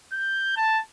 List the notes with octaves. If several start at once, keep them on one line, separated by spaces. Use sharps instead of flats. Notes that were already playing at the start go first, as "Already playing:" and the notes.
G6
A5